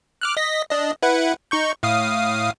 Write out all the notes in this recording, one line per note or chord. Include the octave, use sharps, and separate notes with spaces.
D6 F6 F#6
D#5 A#6 B6
D4 D#5
E4 B4 F#5
D#4 C#6 G6
A2 F5 D#6